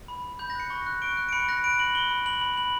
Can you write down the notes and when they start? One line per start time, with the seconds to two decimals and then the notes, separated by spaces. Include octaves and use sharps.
0.08 B5
0.24 B5
0.39 B5 G6
0.50 A#6
0.55 F#6 C#7
0.70 C#6
0.86 F#6
1.02 C#6 D7
1.17 F#6
1.29 D7
1.33 B5 C#7
1.49 F#6 A#6
1.64 B5 D7
1.79 B5 F#7
1.95 B5 G7
2.11 B5
2.26 B5 F#7
2.41 B5
2.57 B5 F#7